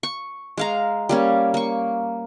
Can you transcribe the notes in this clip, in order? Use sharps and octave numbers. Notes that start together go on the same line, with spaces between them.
C#6
G#3 F5 A#5
G3 A#3 C#4
A#3 C#6